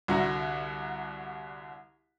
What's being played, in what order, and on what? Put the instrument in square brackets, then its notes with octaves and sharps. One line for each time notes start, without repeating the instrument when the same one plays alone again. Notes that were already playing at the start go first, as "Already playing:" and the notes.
[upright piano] C2 D3 F#4 A#5 A#6